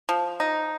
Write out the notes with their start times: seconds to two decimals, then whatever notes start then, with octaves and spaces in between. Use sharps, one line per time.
0.09 F3
0.40 D#4